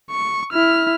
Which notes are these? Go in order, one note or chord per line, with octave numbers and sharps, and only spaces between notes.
C#6
E4 F6